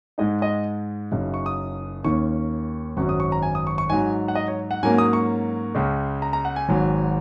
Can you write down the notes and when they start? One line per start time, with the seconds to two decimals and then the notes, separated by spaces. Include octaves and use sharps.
0.18 G#2 G#3 D#4 D#5
0.42 D#5
1.12 F#1 F#2 C#3 F#3 D#4
1.34 C#6
1.46 D#6
2.04 D#2 D#3 A#3 C#4 C#6
2.97 G#1 F#2 F#3 C#4 C#6
3.09 D#6
3.20 C#6
3.32 A#5
3.43 G#5
3.55 D#6
3.67 C#6
3.78 C#6
3.90 G#2 F#3 D#4 G#5
4.28 F#5
4.35 D#5
4.48 C#5
4.71 F#5
4.83 G#2 F#3 A#3 C#4 G#5
4.98 D#6
5.13 C#6
5.75 C#2 C#3 G#3
6.22 A#5
6.33 A#5
6.45 F#5
6.56 G#5
6.68 G#1 G#2 F#3